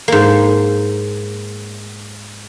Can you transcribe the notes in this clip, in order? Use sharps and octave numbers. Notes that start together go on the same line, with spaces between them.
G#2 A#3